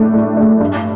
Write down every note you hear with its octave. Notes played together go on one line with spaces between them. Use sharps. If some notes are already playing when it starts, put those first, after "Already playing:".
Already playing: A2 A3 D4
A2
A3 D4
G2